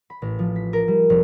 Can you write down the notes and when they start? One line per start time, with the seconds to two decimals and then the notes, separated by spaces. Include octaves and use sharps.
0.10 B5
0.22 A1
0.39 F3
0.56 B6
0.73 A#4
0.88 G3
1.10 F1